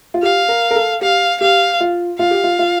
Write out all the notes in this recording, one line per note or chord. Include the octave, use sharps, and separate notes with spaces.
F4
G4 F5
A#4
A#4
A4
G4 F5
G4 F5
F4
F4 F5
G4
F4
F4